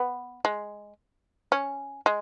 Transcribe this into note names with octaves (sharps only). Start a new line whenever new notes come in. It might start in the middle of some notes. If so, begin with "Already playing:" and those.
Already playing: B3
G#3
C#4
G#3